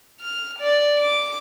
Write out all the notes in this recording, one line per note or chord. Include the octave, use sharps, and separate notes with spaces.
F6
D5
D6